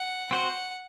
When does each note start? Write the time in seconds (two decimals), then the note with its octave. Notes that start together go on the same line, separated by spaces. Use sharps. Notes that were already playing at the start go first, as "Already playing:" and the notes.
Already playing: F#5
0.31 C4 F#4 C5 F#5